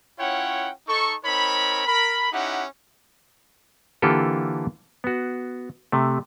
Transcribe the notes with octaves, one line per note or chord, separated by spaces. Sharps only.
C#4 E4 F4 C#5 F#5 G5
D#4 A4 C#6
C4 D#4 A#4 C#5 B5
A#4 B5
C#4 D#4 E4 G4 F#5
D3 E3 A#3 F4 G4 A4
B3 F#4
C3 A3